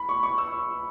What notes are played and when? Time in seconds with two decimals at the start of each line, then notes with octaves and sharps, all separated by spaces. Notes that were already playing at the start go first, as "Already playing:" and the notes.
Already playing: B5
0.09 C#6
0.23 C#6
0.38 E6